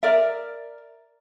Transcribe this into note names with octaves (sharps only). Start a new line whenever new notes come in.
A#4 D5 E5